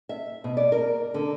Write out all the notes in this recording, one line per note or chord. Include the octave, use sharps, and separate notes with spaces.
E5
B2
D5
A#4
D3